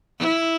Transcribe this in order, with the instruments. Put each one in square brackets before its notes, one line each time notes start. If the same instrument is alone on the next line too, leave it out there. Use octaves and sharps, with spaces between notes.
[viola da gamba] E4